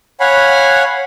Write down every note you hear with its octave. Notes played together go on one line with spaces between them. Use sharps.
C#5 F5 F#5 G#5 B5